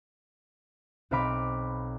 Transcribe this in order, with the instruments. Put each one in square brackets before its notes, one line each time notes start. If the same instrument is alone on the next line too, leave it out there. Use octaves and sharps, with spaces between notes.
[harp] B1 C4 F5 B5 D6